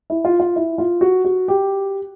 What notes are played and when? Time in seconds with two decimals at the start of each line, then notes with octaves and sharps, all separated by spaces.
0.10 E4
0.25 F4
0.40 F4
0.56 E4
0.78 F4
1.01 F#4
1.25 F#4
1.48 G4